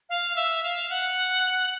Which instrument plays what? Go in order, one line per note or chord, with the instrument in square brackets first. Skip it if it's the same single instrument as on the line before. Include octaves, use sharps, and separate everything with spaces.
[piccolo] F5
E5
F5
F#5